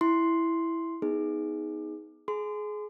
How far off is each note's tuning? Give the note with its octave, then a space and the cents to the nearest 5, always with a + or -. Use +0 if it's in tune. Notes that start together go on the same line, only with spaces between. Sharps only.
E4 +0 C6 +0
B3 +0 D#4 +20 G#4 +0
G#4 +25 C6 -30